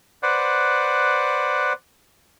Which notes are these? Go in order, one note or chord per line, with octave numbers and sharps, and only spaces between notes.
B4 C5 D5 F#5